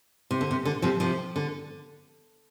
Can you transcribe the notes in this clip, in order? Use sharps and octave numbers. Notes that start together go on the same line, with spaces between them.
C3
D3
C3
D3
C3 F3
C3 F3
D3